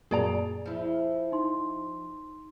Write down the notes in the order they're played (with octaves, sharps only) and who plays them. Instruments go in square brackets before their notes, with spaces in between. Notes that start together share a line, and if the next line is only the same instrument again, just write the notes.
[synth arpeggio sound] F#2 A#2 A#3 [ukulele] G#4 D5 A#5
[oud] F3 E4
[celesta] D#4 C6